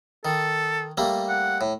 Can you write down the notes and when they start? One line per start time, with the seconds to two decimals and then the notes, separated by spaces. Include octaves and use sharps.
0.25 D#3 A4
0.97 G3 A3 A#3
1.29 F#5
1.61 A2